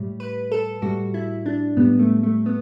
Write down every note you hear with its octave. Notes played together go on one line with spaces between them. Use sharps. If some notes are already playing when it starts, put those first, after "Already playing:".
Already playing: A2 G3
B4
A4
A2 G3 F#4
E4
D4
A2 G3 B3
A3
A3
B3